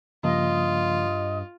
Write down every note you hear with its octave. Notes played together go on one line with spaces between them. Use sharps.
G2 C#3 F3 A#3 F4 D#5